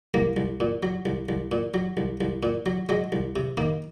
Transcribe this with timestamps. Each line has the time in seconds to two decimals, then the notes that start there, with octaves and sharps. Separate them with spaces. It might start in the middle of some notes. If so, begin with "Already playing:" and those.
0.14 C2 A#3
0.37 C2
0.60 A#2
0.83 F#3
1.06 C2
1.29 C2
1.52 A#2
1.74 F#3
1.97 C2
2.21 C2
2.43 A#2
2.66 F#3
2.89 F#3 G#3
3.12 C2
3.36 C3
3.57 D#3 A#3